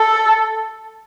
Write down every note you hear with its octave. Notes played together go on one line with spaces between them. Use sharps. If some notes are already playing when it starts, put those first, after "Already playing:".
Already playing: A4